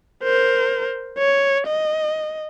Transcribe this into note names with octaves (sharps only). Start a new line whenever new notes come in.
A#4 C5
C#5
D#5